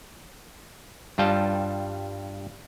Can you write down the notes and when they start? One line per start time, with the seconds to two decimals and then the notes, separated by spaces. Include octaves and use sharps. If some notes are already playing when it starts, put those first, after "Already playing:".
1.18 G2 G3 F4 G5 A5